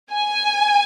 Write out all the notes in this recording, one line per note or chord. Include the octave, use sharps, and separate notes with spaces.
G#5